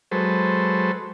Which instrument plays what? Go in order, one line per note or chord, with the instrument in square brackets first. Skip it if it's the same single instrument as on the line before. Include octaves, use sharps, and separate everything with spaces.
[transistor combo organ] F#3 G#3 A4 B4 C5